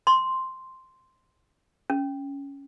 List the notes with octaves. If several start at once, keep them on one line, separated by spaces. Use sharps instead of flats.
C6
C#4